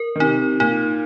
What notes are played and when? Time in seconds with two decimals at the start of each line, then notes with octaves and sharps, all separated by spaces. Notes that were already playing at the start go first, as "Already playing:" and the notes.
Already playing: A#4
0.16 D#3
0.20 C3 D#4
0.60 A#2 D#4